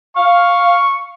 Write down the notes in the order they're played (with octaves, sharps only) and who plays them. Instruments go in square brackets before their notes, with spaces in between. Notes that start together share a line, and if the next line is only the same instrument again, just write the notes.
[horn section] F5 [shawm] C#6